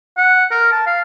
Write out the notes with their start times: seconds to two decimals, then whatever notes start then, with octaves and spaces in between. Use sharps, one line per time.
0.17 F#5
0.51 A#4
0.72 A5
0.86 F5